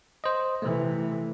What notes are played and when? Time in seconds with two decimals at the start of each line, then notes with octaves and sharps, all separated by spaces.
0.24 C5 D#5
0.62 C3 E3 A3